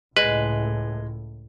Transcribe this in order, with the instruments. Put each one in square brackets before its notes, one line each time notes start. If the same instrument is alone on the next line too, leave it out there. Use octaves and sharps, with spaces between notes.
[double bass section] C#2 A2 [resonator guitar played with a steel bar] G#3 [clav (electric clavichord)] B4